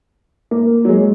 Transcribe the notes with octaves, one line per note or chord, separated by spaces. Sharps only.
A#3
F#3
G#3